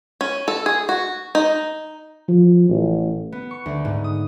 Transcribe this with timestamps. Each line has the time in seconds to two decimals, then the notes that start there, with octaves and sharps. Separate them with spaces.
0.21 C#4
0.48 A4
0.66 G#4
0.89 F#4
1.35 D#4
2.28 F3
2.69 A1
3.32 B3
3.51 C#6
3.66 D2
3.85 G#2
4.04 D#6